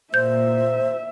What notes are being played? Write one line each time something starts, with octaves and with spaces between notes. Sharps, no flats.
A#2 C5 E5 G6